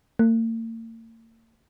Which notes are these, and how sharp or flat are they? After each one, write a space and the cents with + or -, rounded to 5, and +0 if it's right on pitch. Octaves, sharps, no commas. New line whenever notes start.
A#3 -45